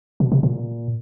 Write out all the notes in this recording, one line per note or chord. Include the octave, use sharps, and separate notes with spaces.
B2
C3
A#2